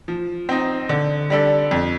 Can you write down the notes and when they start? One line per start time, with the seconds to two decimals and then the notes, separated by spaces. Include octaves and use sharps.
0.08 F3
0.49 C4 D#4
0.89 D3
1.30 G3 D4 A4
1.71 F2